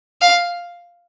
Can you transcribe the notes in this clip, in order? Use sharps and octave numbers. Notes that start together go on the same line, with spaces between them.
F5